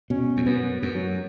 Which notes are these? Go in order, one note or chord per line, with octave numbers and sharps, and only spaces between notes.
B2 C#4
E2
F#2 B3
F#2
F#3